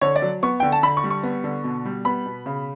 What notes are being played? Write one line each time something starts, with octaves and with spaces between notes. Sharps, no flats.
D3 C#5
D5
F#3
B3 C#6
D3 G5
A5
D3 B5
C#6
G3
C#6
B3
D3
B2
G3
B3 B5
B2
C#3